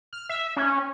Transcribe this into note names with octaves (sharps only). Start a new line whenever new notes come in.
F6
E5
C#4